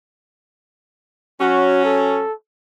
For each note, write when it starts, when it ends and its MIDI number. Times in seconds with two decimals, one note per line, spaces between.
1.41 2.21 54
1.41 2.21 61
1.41 1.81 66
1.85 2.32 69